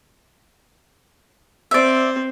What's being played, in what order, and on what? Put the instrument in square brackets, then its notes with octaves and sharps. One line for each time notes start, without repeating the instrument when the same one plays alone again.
[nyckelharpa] C4 C5 [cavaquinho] D5 E5